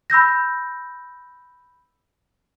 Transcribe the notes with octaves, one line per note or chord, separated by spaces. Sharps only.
B5 E6 G6 A#6